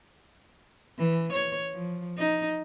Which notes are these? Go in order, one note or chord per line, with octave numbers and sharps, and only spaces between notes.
E3
C#5
F3
D#4